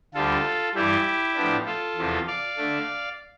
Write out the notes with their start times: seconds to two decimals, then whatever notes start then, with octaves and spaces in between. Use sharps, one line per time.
0.14 D2 D3 G3 F4 A4
0.75 G2 E3 G3 E4 G4
1.35 A2 F3 B3 D4
1.66 F4 A4
1.96 E2 C3 F3
2.27 D5 F5
2.57 D3 A3 D4